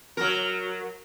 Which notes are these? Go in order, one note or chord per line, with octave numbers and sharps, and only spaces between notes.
F#3 A#4